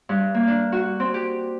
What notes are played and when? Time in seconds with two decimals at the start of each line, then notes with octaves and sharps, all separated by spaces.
0.09 G2
0.34 A#3
0.48 D4
0.72 F#4
1.00 C4
1.14 G4